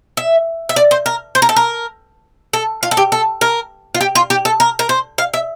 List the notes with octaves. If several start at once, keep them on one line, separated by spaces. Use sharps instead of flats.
E5
E5
D5
C5
A#4
C5
A#4
A4
A#4
A4
F4
A4
G4
A4
A#4
F4
G4
F4
G4
A4
A#4
A#4
C5
F5
E5